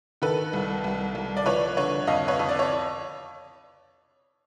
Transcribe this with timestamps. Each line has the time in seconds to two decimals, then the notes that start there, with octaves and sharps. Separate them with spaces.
0.22 D#3 A4 B4
0.53 C2
0.84 C2
1.15 C2
1.37 D5
1.46 F3 B4 C#5
1.77 D3 B4 C#5
2.07 F2 D#5 F5
2.28 B4 C#5
2.39 F2
2.49 D5
2.59 C#5